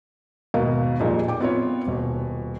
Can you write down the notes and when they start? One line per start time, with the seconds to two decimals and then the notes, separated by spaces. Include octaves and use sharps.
0.54 D#2 G#2 B2 A#4 D#5 F5
1.00 F2 A#2 G3 G#3 D#4
1.28 G5 D6
1.40 B3 C4 F4 B4 C#5
1.87 D#1 B2